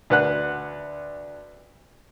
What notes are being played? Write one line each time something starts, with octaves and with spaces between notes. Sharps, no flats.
D2 B4 F#5 F#6